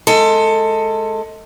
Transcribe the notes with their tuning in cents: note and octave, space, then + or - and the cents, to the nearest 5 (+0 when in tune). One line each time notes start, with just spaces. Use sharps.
G#3 +25 A4 +20